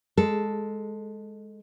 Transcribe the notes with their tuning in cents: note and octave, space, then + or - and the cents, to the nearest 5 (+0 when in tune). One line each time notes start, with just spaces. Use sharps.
G#3 +5 A4 +0